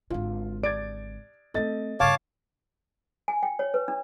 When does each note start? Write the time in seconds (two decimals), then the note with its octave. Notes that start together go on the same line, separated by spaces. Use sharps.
0.10 G#1 D3 F4
0.64 D5 G#6 A6 D7
1.54 A3 C4 A4 D#5 A6
2.00 G2 C#3 C#5 F5 A5 D6
3.28 G#5
3.43 G5
3.59 C#5
3.74 B4
3.88 D4